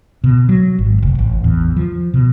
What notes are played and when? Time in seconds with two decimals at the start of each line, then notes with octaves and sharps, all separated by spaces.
0.24 B2
0.49 F#3
0.79 G#1
1.03 F1
1.19 A1
1.44 E2
1.77 F3
2.14 B2